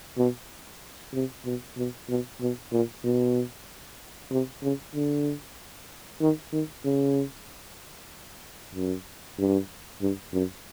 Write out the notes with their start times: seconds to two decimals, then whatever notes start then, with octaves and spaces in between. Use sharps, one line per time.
0.18 B2
1.14 C3
1.45 B2
1.77 B2
2.09 B2
2.41 B2
2.72 A#2
3.04 B2
4.31 C3
4.63 C#3
4.95 D3
6.22 D#3
6.53 D#3
6.85 C#3
8.75 F#2
9.38 G2
10.02 G2
10.34 F#2